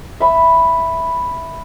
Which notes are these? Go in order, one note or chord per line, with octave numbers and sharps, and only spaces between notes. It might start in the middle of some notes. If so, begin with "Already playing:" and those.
E5 B5